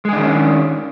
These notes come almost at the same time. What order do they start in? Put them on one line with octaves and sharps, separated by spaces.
G#3 G#4 D4 D#3 C#4